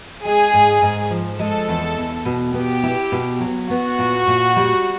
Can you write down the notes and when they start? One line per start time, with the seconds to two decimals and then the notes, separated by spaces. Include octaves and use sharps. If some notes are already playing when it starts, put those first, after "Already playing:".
0.25 G#3 G#4
0.53 G#2
0.82 G#2
1.10 F3
1.39 G#3 A4
1.69 E2
1.98 E2
2.25 B2
2.54 B3 G4
2.83 E4
3.12 B2
3.40 F#3
3.70 B3 F#4
3.99 A#2
4.28 A#2
4.56 G3